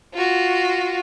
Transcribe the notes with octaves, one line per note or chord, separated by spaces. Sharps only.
F4 F#4